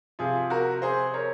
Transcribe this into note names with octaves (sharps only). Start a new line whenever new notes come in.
C3 F3 F4 G#4
F#4 A#4
G#4 C5
A#4 C#5